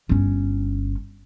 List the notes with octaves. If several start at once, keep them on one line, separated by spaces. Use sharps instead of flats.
G1 C#4